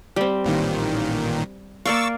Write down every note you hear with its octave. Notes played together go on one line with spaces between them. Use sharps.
G3 C4
A1 A#2 D#3
A#3 D5 F5 C#6 E6 A6